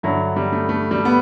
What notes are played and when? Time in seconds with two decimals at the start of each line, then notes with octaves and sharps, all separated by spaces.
0.03 G2 D3 F#3 E4
0.36 G3
0.52 A3
0.69 A3
0.91 G3
1.05 B3